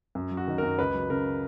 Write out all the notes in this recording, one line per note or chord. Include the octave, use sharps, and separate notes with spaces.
F#2
F#3
F#4
D#3
F#2 A#4
C#2 B4
F#3
C#3 A#4